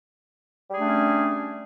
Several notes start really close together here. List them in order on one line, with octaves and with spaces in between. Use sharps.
G3 G#4 A3 D4 C#4